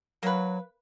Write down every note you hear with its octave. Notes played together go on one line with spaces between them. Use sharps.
F#3 A#3 B4